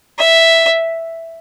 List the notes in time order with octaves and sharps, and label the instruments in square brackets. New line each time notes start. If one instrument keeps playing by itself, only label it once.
[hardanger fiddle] E5